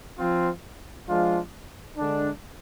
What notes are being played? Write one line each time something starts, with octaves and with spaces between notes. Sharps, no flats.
F3 C4 F4
F3 G#3 D4 F4
D3 G#3 D4